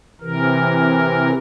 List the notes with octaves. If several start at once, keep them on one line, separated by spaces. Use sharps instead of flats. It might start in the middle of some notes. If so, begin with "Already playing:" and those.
C3 E3 A#4